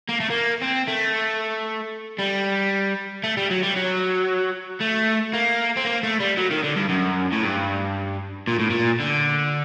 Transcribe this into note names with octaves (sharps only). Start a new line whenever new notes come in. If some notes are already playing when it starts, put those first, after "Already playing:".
A#3
A3
A#3
C4
A3
G3
A3
G3
F#3
G3
F#3
A3
A#3
C4
A#3
A3
G3
F#3
D#3
D3
G2
F#2
A2
G2
A#2
A2
A#2
D3